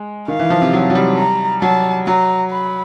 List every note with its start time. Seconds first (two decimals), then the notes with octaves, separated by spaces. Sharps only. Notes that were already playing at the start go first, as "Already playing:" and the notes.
Already playing: G#3
0.28 D#3 F5
0.39 E3
0.50 F3
0.61 C3
0.73 F#3
0.90 F#3
0.95 G3
1.18 A#5
1.62 F#3 A5
2.07 F#3 A#5
2.51 B5